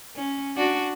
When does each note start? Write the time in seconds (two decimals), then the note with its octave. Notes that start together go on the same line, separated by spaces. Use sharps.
0.16 C#4
0.57 D4 F#4